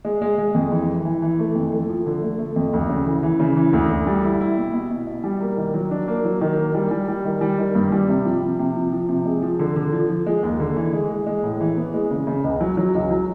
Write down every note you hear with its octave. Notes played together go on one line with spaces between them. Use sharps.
G#3
G#3
G#3
F2
E3
E3
E3
E3
A3
F2
A3
F3
D3
A3
A3
F2
D2
C#3
E3
E3
C#3
E3
D2
D2
G3
E4
E4
B2
B2
B2
B2
G3
A#3
D#3
F#3
D4
A#3
F#3
D#3
A#3
G3
G3
G3
D#3
G3
D#3
G2
G3
C3
F3
C3
C3
F3
F3
C3
G#3
F3
D3
D3
F3
F3
G#3
D#2
D3
E3
G#3
G#3
G#3
A2
E3
B3
G#3
C#3
C#3
C#2
F#3
F#3
C#2
F#3